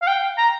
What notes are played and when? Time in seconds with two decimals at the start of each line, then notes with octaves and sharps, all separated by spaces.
0.02 F5
0.07 G5
0.38 A#5